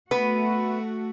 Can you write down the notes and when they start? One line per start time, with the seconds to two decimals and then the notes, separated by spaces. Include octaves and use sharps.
0.11 A3 B3 F#4 B4